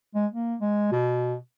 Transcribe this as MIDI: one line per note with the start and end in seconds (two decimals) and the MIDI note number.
0.15 0.26 56
0.32 0.55 58
0.60 0.89 56
0.92 1.36 47